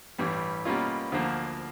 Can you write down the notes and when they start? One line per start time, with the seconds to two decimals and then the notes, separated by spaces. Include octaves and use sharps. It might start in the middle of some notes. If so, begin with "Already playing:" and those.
0.18 A1 G2 E3 G3
0.65 B2 G3 A#3 C#4 F4
1.12 D2 D3 F3 A#3